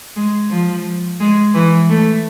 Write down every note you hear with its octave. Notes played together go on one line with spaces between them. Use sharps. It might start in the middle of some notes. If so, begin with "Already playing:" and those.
G#3
F3
G#3
E3
A3